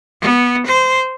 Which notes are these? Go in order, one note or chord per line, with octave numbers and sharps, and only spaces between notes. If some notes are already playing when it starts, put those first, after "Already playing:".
B3
C5